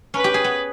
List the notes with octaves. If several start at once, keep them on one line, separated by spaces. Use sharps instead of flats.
C#4 B4
G4
G#4
B3